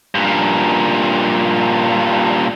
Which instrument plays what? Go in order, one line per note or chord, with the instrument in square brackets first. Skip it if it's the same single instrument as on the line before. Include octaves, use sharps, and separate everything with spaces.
[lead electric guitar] G2 A#2